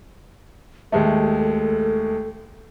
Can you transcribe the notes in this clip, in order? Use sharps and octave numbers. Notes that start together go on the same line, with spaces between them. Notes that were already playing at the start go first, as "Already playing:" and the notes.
D#2 G#3 A3 A4